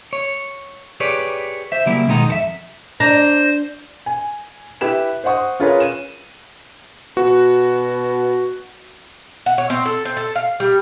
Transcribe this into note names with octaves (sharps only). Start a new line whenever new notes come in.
C#5
G4 G#4 B4 C#5 D5
C5 E5
C#3 F#3 G3 A#3 E4
B2 D#3 G#3 B3 D#4 A#5
F2 A4 E5
D4 C5 A#5
G#5
E4 G4 B4 E7
C5 D#5 F#5 C#6 D#6
C#4 F4 G#4 A#4 B4 C#5
D#7 E7
B2 F#4
F#5
C#5
C4
A4
C4
A4
F5
G3